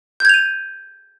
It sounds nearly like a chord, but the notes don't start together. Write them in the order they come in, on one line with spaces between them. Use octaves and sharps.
G6 G#6 F7 D#7